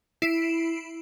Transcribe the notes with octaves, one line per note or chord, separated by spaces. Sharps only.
E4 C7 D7